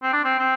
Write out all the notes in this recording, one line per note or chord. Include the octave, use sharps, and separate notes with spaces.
C4
D4
C4
C4